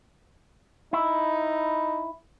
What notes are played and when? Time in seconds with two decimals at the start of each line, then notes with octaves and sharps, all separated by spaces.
0.93 D#4 E4